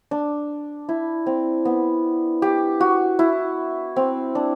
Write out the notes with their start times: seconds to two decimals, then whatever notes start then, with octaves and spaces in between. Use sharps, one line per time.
0.11 D4
0.89 E4
1.26 C4
1.65 B3
2.42 G4
2.80 F#4
3.19 E4
3.96 C4
4.35 D4